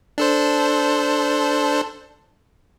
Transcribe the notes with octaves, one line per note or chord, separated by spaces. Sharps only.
D4 A4 C5